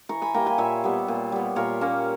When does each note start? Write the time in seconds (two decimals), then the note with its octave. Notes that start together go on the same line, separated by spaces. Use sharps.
0.09 E3 A#5 C#6
0.22 G#5 B5
0.34 G3 A#3 G5 A#5
0.46 G#5 B5
0.58 A#2 C#5 E5
0.84 G3 B3
1.08 A#2
1.32 G3 B3
1.56 A#2 A#4 C#5
1.81 A#3 C#4